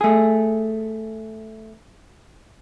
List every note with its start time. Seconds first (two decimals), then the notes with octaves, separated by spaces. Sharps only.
0.01 A3 G#4